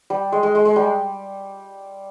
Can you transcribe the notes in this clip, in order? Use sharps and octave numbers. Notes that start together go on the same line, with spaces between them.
G3
G#3
G#3
G#3
G#3
G3